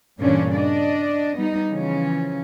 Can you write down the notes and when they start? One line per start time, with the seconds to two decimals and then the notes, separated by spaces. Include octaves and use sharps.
0.19 G2 A#2 C#3 E3 C#4 D4
0.52 D4 D5 D#5
1.37 G3 B3 D#4
1.70 C#3 E3 F3 C#4